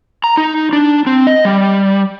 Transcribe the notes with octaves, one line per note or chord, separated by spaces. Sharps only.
A#5
D#4
D4
C4
D#5
G3